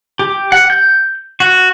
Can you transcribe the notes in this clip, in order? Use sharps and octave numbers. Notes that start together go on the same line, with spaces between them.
G4
F#5
G6
F#4